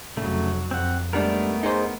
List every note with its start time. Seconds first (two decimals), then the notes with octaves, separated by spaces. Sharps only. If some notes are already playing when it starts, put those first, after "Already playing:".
0.17 F1 C#3 F#3 A3
0.71 F2 C4 F#5
1.13 G#2 G3 A3 B3 D4 A#4
1.63 D#4 G#4 C5